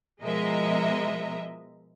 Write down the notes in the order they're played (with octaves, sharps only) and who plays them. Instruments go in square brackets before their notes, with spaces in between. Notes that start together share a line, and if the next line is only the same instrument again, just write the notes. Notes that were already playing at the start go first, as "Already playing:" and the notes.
[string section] B2 F3 G#3 A#4 D#5 E5